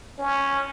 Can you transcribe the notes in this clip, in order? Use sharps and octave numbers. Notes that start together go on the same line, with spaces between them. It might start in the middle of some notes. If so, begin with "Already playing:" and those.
C#4